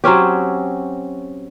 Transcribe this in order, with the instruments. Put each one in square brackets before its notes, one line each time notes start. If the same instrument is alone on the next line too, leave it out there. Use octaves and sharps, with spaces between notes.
[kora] F#3 C4 C#4 G4